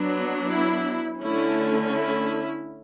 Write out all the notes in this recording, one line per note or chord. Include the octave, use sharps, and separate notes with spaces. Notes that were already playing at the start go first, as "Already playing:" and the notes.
Already playing: F#3 B3 D4
E4
D3 A3 C#4 E4
E4